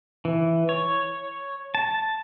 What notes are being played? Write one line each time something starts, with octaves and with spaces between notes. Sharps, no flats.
E3
C#5
A5